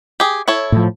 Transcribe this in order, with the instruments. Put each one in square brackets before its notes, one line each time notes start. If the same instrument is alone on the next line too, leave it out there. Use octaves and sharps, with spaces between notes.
[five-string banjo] G4 G#4
E4 A4 C#5
[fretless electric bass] A2 F3